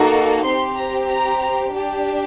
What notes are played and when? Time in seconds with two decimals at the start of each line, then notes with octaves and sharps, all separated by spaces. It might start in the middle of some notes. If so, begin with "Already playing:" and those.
Already playing: A#3 D#4 F#4 A4
0.44 C4 G4 C6
0.77 A#5
1.09 A#5
1.72 D4 G4